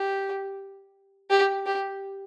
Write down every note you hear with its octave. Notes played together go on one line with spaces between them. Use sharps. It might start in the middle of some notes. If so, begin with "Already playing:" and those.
Already playing: G4
G4
G4